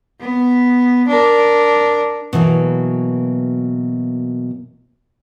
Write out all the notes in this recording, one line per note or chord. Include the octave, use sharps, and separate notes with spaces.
B3
D4 A#4
B2 E3 F#3 A#3